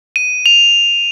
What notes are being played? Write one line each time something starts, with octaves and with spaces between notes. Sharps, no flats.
D#7
F7